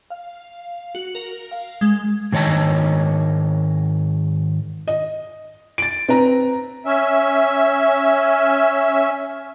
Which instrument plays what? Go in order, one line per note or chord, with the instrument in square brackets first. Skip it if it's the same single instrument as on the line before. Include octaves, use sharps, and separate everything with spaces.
[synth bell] F5
F#4
A#4
F5
G#3
[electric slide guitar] G#2 D#3 C#5 D#5 A5
[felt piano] D#5
A6 D7
C4 B4 A#5
[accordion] C#4 E5